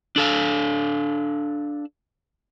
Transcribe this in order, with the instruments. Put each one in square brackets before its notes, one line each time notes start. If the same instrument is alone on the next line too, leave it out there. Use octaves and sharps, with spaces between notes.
[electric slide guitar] D4 A4 F5